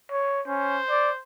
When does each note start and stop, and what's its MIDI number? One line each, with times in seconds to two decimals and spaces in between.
0.11 0.41 73
0.47 0.80 61
0.47 1.21 72
0.90 1.11 74